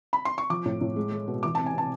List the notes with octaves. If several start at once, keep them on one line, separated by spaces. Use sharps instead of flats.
B5
C6
C#6
F3 D6
A2
A2
G#3
G#3
B2
E3 D6
C3 A5
G#5
C3 A5